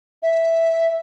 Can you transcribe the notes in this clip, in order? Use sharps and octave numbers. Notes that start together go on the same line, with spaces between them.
E5